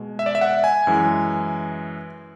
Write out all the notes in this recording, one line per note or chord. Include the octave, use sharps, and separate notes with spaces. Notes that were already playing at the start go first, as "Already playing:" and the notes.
Already playing: B2 G#3
E5
D5
E5
F#5
G#5
F#2 E3 G#3